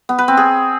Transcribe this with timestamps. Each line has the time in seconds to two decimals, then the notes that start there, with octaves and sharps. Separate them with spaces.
0.09 B3
0.18 B4
0.28 C4
0.37 G#4